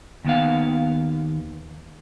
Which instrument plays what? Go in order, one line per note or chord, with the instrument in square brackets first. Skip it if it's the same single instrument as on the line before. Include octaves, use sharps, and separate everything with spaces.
[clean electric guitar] D#2 D#3 B3 F5